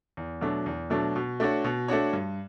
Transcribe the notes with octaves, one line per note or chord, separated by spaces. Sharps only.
E2
B2 F#3 A3 D4
E2
B2 F#3 A3 D4
B2
A3 D4 F#4 C#5
B2
A3 D4 F#4 C#5
G2